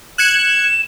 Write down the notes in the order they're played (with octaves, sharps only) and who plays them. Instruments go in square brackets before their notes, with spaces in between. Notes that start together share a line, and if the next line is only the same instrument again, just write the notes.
[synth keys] F#6 G#6 C#7 [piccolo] E7